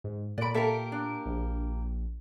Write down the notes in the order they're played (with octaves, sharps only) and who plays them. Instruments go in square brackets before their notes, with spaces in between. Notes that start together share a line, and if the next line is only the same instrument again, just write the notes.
[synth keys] G#2
[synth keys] A#2 D7 [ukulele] D5 B5
[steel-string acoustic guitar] A#3 G4 A#4 [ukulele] A4 E5
[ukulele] D4
[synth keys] A#1